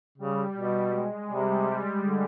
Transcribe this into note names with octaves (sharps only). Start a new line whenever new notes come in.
C#3 G3
B2 G3
G#3
C3 G3
D3